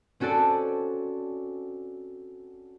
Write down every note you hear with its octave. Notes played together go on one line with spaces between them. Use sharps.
C4 C#4 F#4 A4 D5